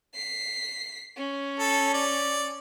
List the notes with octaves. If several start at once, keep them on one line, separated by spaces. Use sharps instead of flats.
B6 C7
C#4
A4
D5